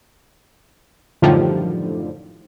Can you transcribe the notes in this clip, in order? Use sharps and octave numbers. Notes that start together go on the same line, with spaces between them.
F#2 A2 D3 D#3 F3 G3